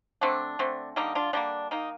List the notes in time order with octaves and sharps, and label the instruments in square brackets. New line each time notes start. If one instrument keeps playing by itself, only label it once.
[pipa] D3 A3 C4 D4
D3 A3 C4
D3 G3 A#3 D#4
D4 F4
D3 G3 A#3 D4
D#3 A#3 D#4